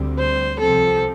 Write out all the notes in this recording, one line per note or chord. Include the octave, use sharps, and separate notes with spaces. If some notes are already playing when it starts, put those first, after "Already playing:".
Already playing: D2 D3 G3 C4
C5
C2 C3 F3 C4 A4